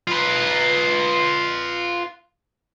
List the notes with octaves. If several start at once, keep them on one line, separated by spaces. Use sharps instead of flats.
F4 B4